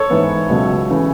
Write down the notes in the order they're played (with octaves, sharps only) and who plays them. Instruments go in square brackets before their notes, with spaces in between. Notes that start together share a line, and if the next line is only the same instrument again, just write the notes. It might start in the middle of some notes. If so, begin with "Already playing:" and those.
Already playing: [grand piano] A4 C#5
[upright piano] G#2 E3 B3
C#2 B2 F#3 A3
C#3 E3 A3